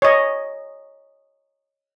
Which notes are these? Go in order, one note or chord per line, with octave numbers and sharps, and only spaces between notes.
C#5 D#5